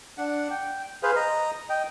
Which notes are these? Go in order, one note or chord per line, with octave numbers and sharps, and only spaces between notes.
D4 F#5
G5
G#4 B4 C5 F5
D#5 A#5
D#5 G5